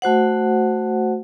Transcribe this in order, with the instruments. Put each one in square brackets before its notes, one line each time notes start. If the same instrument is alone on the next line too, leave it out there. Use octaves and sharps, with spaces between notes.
[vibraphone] A3 F#4 C5 F#5